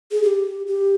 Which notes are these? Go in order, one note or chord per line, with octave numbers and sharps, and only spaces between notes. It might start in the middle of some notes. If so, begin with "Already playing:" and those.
G#4
G4
G4